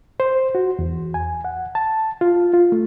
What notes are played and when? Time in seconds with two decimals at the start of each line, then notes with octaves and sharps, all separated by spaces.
0.20 C5
0.55 F#4
0.79 E2
1.14 G#5
1.45 F#5
1.75 A5
2.21 F4
2.53 F4
2.72 A3